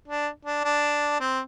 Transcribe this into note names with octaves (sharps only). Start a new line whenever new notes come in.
D4
D4
D4
C4